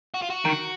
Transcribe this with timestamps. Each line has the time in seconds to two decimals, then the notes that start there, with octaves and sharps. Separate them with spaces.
0.14 F#4
0.22 F4
0.30 F#4
0.45 D#3